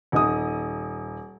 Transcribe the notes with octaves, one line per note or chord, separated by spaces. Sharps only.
D#1 D#4 D#6